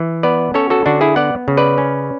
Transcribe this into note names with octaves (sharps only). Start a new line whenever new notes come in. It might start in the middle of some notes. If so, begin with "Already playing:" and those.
Already playing: E3
B3 B4 D5
C#4 A4 C#5
F#4 A4
D3 D4 F#4
E4 G#4
B3 D5 F#5
C#3
B4 D5
C#4